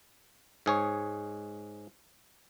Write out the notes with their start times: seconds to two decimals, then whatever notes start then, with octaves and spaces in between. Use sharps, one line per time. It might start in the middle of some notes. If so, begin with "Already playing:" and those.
0.66 G#2 G#4 C#5